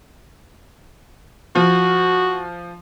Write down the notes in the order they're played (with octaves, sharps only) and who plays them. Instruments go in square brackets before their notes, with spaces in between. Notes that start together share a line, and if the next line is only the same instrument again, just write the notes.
[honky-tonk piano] F3 [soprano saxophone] F#4